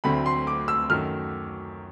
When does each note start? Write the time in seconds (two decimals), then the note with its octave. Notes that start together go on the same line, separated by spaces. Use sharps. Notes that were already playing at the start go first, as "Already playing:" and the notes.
0.04 D2 D3 F#3 A3 C4 B5
0.26 C6
0.47 D6
0.68 E6
0.90 F#2 D#3 F#3 A3 F6